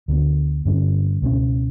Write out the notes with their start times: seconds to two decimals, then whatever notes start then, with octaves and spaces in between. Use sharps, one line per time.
0.08 D2 D3 F#3 B3
0.65 G2 D3 G3 C#4
1.22 C#2 B2 A3 C#4